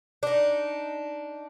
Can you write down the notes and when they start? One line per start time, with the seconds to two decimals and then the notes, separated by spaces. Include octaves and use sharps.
0.23 D4 D#4